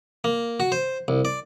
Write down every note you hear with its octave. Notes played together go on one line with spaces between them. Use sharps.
A#3
F#4
C5
C2
D5